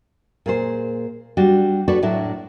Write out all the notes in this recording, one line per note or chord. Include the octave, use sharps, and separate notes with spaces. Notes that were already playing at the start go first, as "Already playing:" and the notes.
A#2 G#4 C5
G3 D4 F#4
D4 F#4 A4 B4 C#5 D5
A2 F#3 D4 E4